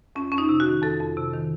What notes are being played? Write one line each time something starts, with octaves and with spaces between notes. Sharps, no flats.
F2 C#4
F2 C#4
D#4
C3
F#4
D#3
F2 A4
F2
C3
D#3